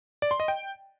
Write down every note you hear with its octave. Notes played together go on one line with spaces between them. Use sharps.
D5
C6
D#5
G5